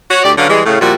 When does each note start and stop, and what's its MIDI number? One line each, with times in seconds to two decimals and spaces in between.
0.10 0.23 66
0.10 0.23 73
0.24 0.32 38
0.24 0.32 67
0.24 0.32 74
0.38 0.49 50
0.38 0.49 54
0.38 0.49 61
0.38 0.49 71
0.38 0.49 77
0.49 0.63 52
0.49 0.63 55
0.49 0.63 56
0.66 0.77 45
0.66 0.77 49
0.81 0.94 46
0.81 0.94 53
0.81 0.94 55
0.81 0.94 64
0.81 0.94 66